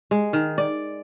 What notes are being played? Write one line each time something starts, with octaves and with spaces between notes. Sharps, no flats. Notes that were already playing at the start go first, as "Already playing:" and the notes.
G#3
D#3
D5